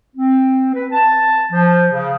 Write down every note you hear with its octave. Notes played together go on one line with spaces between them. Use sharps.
C4
B4
A5
F3
C#3